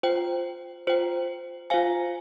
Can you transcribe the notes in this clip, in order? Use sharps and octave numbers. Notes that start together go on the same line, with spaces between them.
F4 C5 G5
F4 C5 G5
F4 C5 F5 G#5